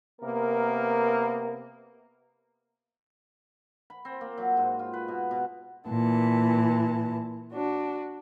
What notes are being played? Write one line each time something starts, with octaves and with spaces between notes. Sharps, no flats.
C3 A#3 B3 A#4
B5
C4
A#3
F#3
G#2
F4
B4
B2
B2
A#2 E3 A5
D4 F#4